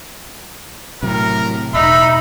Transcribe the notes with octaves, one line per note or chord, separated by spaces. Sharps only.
A2 C3 F#3 A#4
E1 D#4 E5 B5